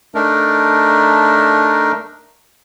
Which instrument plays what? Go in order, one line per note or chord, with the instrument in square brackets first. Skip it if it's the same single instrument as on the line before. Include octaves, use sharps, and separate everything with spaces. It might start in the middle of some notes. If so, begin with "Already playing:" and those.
[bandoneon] A3 D4 D#4 A#4